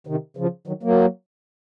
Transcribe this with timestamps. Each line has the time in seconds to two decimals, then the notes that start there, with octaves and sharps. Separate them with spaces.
0.07 C3 D#3
0.37 C#3 F3
0.67 D#3 F#3
0.83 F#3 A#3